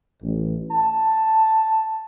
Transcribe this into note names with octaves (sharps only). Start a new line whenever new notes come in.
A1
A5